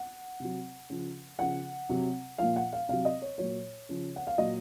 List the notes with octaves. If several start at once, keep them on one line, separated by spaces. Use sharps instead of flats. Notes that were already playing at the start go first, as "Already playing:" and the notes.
Already playing: F#5
C3 F#3
C#3 F3
C#3 F3 F#5
C3 F#3
A#2 F3 F5
F#5
F5
C3 F#3 F5
D#5
C#5
A#2 F#3 C#5
C#3 F3
F#5
F5
A#2 F#3 D#5